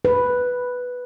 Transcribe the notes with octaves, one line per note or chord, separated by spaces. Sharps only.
B4